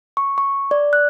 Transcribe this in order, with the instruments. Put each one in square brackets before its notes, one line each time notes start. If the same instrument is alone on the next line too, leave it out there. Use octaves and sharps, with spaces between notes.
[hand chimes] C#6
C#6
D5
F#6